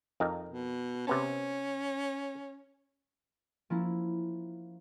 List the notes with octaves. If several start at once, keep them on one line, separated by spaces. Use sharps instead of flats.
F2 D#4 A#4
B2
C3 B3 C#4 A5
F3 A#3 C#4 E4